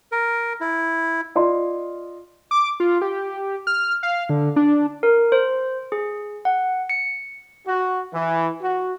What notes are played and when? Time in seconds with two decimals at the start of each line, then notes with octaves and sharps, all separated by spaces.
0.12 A#4
0.61 E4
1.35 F4 D5 D#5 C6
2.51 D6
2.80 F4
3.02 G4
3.67 F6
4.03 F5
4.29 D3
4.56 D4
5.03 A#4
5.32 C5
5.92 G#4
6.45 F#5
6.90 C#7
7.66 F#4
8.14 E3
8.62 F#4